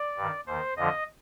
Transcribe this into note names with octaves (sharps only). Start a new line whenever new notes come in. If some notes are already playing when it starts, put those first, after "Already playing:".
Already playing: D5
G2 D#3
D#2 D#3 C5
F2 D3 F3 D#5